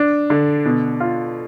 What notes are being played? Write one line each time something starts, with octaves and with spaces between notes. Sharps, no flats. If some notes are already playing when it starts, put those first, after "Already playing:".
Already playing: D4
D3
B2
F4